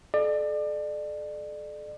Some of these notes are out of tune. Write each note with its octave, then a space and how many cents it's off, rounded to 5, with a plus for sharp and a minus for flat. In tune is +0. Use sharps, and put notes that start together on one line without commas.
A4 -35 D5 +30